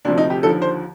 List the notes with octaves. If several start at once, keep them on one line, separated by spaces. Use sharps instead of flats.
D2 C3 F3 D4
D#4
G4
D#2 D3 F3 A4
C5